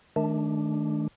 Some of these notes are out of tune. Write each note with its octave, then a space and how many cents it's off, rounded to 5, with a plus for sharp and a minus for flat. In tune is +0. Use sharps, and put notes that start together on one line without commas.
D#3 +0 A3 -30 D4 +0